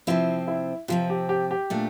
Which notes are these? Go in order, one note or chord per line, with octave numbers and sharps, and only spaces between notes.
C3 F3 C4 E4
E4
C3 F3 C4 F4
G4
G4
G4
A#2 A3 D4